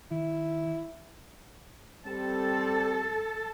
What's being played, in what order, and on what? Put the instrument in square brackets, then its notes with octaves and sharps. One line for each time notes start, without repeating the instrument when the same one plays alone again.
[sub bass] D#3 [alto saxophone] E4
[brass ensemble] G3 C4 [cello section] A4